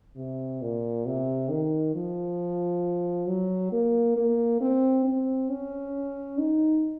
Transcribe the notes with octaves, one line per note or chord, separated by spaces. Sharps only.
C3
A#2
C3
D#3
F3
F#3
A#3
A#3
C4
C4
C#4
D#4